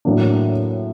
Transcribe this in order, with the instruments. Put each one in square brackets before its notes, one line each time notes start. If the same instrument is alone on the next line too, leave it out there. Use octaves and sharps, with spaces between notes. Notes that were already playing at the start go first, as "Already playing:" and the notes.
[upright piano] A2 F#3 A#3 D4